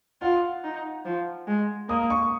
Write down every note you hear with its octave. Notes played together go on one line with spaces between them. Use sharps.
F4 F#5
D#4
F3
G#3
A#3 D#6
C#6